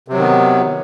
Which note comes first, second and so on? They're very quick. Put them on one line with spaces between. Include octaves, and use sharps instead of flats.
C3 F#3 D#3 B3